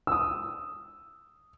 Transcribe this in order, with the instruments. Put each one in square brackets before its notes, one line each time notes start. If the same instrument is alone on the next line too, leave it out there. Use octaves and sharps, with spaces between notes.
[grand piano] D#6 E6